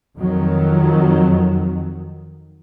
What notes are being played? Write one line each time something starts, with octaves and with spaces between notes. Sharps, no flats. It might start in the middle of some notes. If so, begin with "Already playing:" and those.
F2 D#3 F#3